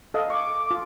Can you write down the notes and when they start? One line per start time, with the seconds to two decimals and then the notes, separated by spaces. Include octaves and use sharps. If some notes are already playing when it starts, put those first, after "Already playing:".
0.14 A4 D#5 F5
0.30 C#6 D6
0.71 F4